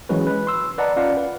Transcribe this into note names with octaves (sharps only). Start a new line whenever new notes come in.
E3 F#3 G#3 C#4 F#4 B4
B4
C6 E6
B4 D5 D#5 F#5 A5 A#5
C#4 F4 D5 F5 F#5
B4